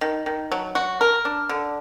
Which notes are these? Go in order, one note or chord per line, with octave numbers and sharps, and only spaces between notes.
D#3
D#3
F#3
F#4
A#4
D4
D3